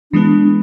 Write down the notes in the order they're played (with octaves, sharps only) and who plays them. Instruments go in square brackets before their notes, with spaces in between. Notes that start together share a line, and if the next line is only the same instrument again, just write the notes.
[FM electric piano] E3 G#3 B3 [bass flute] D4